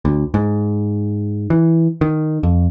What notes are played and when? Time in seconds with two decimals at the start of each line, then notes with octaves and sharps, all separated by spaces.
0.05 D2
0.34 G#2
1.50 E3
2.01 D#3
2.43 F2